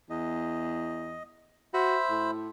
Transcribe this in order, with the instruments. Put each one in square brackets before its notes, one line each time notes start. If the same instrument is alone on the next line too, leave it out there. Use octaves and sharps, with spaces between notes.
[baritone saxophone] E2 [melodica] D#5
[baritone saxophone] F#4 [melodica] C5 E5 B5
[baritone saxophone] A2